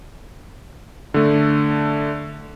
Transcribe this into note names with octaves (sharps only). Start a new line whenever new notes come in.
D3 A3